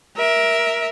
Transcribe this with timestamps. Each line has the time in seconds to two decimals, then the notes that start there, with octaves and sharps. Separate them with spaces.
0.17 A#4 E5